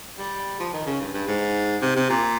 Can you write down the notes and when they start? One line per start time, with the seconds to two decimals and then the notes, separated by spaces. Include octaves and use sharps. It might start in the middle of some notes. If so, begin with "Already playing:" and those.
0.18 G3
0.60 F3
0.73 D#3
0.86 C#3
1.01 G2
1.13 G2
1.27 G#2
1.82 C3
1.96 C3
2.09 A#2